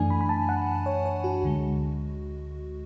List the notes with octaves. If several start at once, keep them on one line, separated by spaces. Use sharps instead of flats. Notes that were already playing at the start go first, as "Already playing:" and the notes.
Already playing: F#2 E3 A3 D4 G#5
B5
B5
A5
F#5
C#5
C#5
F#4
D2 D3 G#3